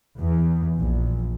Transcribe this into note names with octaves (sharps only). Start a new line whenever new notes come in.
E2
A#1